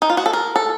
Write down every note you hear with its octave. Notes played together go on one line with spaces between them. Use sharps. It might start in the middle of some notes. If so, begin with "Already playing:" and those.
D#4
F4
F#4
A4
A#4
A4